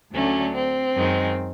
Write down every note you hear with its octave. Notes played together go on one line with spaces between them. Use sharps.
D2 D3 F#3 A3 C#4
C4
F#2 D#3 G#3